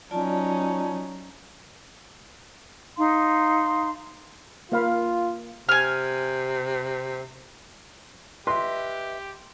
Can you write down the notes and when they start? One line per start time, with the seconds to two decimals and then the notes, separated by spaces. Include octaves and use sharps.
0.11 F#3 C#4 D#4 F4 D5 A5
2.97 D#4 F5 C6
4.72 A#3 F4 F5 B5
5.69 C3 G#5 F6
8.47 G4 B4 D#5 E5 C6